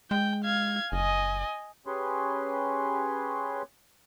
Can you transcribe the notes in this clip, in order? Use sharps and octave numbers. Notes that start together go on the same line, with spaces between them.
G#3 G5
F5 G#6
F#1 D#5 G#5
C#4 G4 G#4 B4 C#5 C6